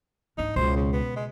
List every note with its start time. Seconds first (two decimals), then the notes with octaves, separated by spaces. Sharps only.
0.38 G#2 D4 D#4
0.56 C#2 B2 C5
0.76 C#3
0.93 B3
1.16 G#3